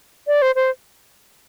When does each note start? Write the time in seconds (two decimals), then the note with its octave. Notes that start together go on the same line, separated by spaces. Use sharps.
0.27 D5
0.42 C5
0.55 C5